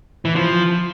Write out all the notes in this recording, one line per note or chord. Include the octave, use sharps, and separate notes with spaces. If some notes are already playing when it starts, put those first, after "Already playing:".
E3
F3